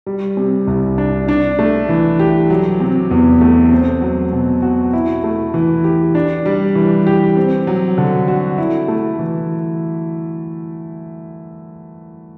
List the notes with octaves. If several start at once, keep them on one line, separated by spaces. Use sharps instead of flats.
G3
C3
C2
D4
D4
A3
E3
G4
F#3
C3
E2
A3
C4
F#3
B2
F#4
E4
A3
E3
G4
D4
G3
E3
G4
C4
F#3
D3
F#4
E4
A3
E3